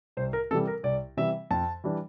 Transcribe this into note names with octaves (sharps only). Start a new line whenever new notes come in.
C2 C5
A#4
C3 E3 G3 A4
A#4
C2 D5
C3 E3 G3 E5
F2 A5
E3 G3 D4